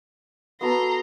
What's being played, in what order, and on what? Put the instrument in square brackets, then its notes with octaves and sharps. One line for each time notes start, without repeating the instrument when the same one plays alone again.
[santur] B3 F#4 A4 [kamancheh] A#5 C6